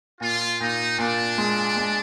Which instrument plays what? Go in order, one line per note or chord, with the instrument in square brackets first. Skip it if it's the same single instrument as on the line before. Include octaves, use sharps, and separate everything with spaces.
[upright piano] A#2 [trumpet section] F4
[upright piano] A#2 [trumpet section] D#4
[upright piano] A#2 [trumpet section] D4
[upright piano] G#3
G#3